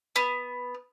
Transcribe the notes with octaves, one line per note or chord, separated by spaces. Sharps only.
B3